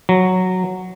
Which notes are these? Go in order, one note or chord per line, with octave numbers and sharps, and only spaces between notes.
F#3